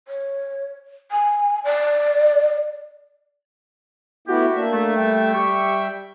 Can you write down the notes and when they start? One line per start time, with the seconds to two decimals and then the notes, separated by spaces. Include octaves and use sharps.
0.08 C#5
1.11 G#5
1.64 D5
4.27 A3 B3 E4 F#4 G4
4.54 A#3 D4 E5
4.73 A3
4.97 G3 E5 G5
5.34 G4 C#6